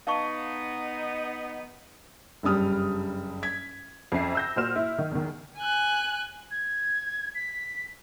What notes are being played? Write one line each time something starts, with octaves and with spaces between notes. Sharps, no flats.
B3 D#4 F5 A5 C#6
F#1 G2 G3 D#6 F6
G#6 B6
F2 C#4 E5 C7
E6 G6 A#6
A#2 F#4 C5 F6 E7
E4
D#3 D#4
E2 D#3
G#5 F#6
G#6
B6